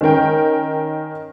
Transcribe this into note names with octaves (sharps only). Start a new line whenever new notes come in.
D#3 C#4 A#4 G5